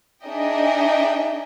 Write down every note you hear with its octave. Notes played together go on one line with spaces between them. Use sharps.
D4 D#4 G#4 D#5 E5 G5